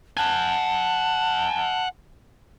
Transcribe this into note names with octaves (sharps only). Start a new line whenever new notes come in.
F#5 G#5 A5